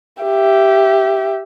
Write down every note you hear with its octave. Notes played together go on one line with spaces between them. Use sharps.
G4 E5